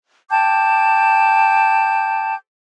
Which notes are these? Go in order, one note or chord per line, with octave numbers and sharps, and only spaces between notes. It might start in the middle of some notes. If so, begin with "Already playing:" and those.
G5 A5 D6 G6